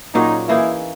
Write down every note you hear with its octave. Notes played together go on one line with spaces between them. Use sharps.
A#2 F#3 C#4 D#4 G#4
E3 A#3 D#4 E4 G#4